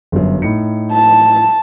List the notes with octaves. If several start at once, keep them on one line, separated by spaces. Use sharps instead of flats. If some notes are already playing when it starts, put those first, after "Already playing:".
G1 F#2
A2 D#4 C#7
A5